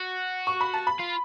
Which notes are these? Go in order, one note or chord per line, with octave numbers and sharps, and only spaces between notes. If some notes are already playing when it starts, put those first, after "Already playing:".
Already playing: F#4
C#6
B5
A5
B5
F4